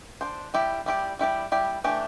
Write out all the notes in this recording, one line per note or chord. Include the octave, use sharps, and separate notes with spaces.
D4 C5
G3 E4 G4 D5
G3 E4 G4 D5
G3 E4 G4 D5
G3 E4 G4 D5
E3 A3 D4 G4